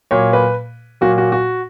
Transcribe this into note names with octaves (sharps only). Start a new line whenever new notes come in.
A#2 F#3 A#3 C#5
B4
A#2 F#3 A#3 F#4
F#4
F#4